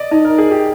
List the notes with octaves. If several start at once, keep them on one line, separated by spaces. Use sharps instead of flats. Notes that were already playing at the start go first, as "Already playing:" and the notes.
Already playing: D5 D#5
D#4 D#5
A#4
G#4 D5
G4